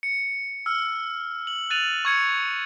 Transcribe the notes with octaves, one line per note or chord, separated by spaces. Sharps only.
C#7
E6 F6 C#7
F#7
F#6 A6 D#7 F7 F#7
C#6 G#6 C#7